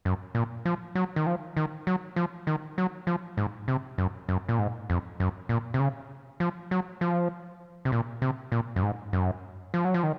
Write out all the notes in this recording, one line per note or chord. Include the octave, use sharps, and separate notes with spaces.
F#2
A#2
F3
F#3
D#3
F3
D#3
F#3
F3
D#3
F#3
F3
G#2
C3
F#2
F#2
A#2
G#2
F2
F#2
A#2
C3
C#3
F3
F#3
F3
C3
A#2
C3
A#2
F#2
G#2
F#2
F3
F#3
F3
D#3